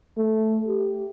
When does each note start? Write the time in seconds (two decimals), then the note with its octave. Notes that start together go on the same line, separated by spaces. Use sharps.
0.17 A3
0.67 G4